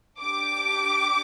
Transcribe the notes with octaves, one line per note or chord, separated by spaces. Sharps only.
D4 G4 D6